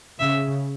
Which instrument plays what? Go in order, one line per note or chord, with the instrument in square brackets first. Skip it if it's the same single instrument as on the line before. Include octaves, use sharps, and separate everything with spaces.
[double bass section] C#3 [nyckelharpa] E5